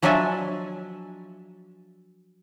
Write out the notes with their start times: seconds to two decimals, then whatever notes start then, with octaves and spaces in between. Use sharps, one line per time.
0.02 F3 F#3 D4 D#5 E5 G#5